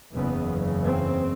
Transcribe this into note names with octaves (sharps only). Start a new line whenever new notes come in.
F#1 E2 C#3 B3
C4